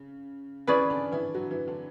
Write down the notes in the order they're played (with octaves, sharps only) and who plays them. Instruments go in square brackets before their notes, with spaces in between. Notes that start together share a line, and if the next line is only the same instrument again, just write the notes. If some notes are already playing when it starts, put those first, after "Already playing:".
Already playing: [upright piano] C#3
[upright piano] E3 E4 [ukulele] C#4 G#4 B4 D5
[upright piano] D3 D4
E3 E4
F#3 F#4
E3 E4
D3 D4